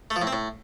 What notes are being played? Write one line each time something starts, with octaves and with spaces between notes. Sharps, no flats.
A3
F3
A2
C4
A2